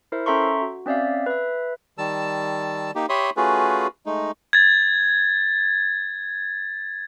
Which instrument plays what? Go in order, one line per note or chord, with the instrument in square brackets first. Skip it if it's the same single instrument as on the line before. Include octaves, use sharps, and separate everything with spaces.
[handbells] E4 A#4 C5 E5
C#4 A4 E5 A#5 C6 C#6
F#4
C4 C#4 D5 E5 F5
B4 E5
[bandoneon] D#3 G3 A5 E6
A#3 D#4 G4
G4 C#5 E5 B5 C6 D#6
A3 C#4 F4 F#4 G#4 B4
G#3 A3 D#4
[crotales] G#6 A6